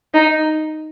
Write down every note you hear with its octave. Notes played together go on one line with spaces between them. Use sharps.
D#4